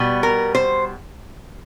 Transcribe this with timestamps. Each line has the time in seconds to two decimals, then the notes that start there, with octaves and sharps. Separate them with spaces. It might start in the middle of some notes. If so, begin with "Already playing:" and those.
Already playing: B2 G3 B3
0.23 A#4
0.55 C5